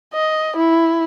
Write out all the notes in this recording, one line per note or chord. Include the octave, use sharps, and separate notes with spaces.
D#5
E4